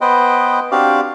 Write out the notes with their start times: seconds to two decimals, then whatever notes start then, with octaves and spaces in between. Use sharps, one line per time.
0.01 B3 B4 C5 D#5 G5
0.71 C4 D4 F#4 G4 D5 F5